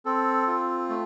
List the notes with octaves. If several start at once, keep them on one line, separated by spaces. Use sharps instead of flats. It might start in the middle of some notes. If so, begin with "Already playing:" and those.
C4 A4
F4
A3